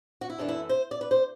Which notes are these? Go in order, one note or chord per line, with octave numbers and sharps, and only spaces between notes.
F#4
E4
F#2 E3 A3 D4
E4
C5
D5
B4
C5